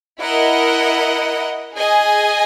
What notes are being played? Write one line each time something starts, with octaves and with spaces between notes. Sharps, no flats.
E4 A#4 D#5 F#5
G#4 D#5 G#5